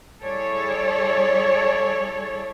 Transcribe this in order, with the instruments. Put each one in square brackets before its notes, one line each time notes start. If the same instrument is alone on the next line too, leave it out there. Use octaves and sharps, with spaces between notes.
[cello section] G3 E4 G#4 A4 C#5 D5